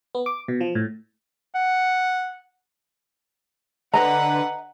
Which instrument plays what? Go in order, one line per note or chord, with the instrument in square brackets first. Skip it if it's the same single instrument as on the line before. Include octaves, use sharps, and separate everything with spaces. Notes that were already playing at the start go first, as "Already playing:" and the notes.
[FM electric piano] B3
D6
B2
F3
A2
[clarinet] F#5
[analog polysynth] D3 B4 [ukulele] D#5 A#5 [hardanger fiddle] F#5